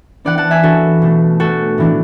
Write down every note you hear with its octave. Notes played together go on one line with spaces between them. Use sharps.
E3 B3 D4 D5 F#5
F#5 A5
E5 G#5
E3 B3 D4 F#4 A4
B2 A3 D4
B2 A3 D4 F#4 A4
A2 E3 B3 D4